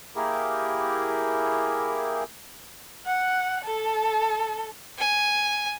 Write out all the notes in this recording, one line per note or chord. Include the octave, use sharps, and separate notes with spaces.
A#3 E4 G4 G#4 A#4
F#5
A4
G#5